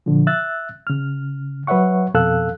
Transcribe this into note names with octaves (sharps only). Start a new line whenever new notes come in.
A#2 D3 F3
E5 E6 F#6 A6
C#3 F6
F#3 B4 C#5 E5 F#5 C#6
F2 B2 A4 F5 E6 F#6